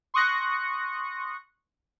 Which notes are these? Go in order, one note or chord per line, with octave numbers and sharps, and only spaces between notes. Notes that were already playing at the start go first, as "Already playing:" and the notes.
C6 C#6 D#6 F#6 A#6 C#7